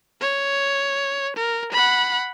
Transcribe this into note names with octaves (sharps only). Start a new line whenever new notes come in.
C#5
A#4
F#5 B5